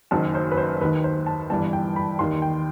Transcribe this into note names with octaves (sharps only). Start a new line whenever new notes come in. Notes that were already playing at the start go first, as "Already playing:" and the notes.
F#1 F#2 D#3 A5
C5
B4
C5
D#2 D#3 B4
C5
A5
G1 G2 E3 A5
G5
B5
D#2 D#3 C6
G5